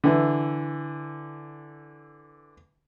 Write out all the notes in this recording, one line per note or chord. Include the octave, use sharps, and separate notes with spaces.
D3 E3